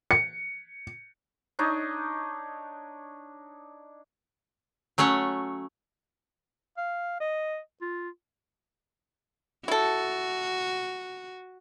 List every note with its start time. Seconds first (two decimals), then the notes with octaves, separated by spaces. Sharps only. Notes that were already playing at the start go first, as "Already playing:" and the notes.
0.11 C#7
1.59 D4 D#4 C#5 D#5
4.98 F#3 A3 C#4 C#5 F#5
6.77 F5
7.20 D#5
7.81 F4
9.68 E4 F#4 A4